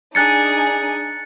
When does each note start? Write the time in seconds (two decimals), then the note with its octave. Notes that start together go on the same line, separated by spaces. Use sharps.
0.15 D4 D#4 G#4 F#6 A6 C#7